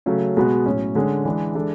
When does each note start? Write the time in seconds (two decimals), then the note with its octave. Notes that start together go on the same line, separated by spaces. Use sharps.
0.06 C#3 F#3 A3 C#4
0.37 B2 G#3 B3 F#4
0.66 A2 F#3 C#4
0.95 D3 G#3 C#4 G#4
1.25 E3 G#3 D4
1.55 E3 G#3 D4 A4